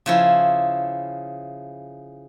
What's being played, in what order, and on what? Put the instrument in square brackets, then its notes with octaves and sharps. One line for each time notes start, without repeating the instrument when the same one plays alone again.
[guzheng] C#3 F3 E4